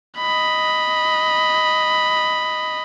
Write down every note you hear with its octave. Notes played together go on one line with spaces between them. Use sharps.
D#5 B5